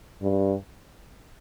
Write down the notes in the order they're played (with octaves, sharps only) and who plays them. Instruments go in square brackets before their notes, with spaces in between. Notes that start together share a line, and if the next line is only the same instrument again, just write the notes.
[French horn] G2